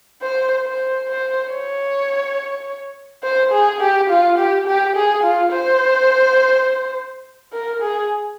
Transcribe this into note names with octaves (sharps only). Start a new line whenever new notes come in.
C5
C5
C5
C#5
C5
G#4
G4
F4
G4
G4
G#4
F4
C5
A#4
G#4